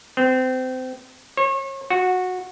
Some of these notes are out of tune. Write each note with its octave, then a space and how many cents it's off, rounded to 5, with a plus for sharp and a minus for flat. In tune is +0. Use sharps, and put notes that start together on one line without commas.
C4 -25
C#5 -35
F#4 -15